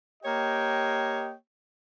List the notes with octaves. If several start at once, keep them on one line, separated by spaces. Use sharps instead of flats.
A#3 G4 C#5 D#5 G5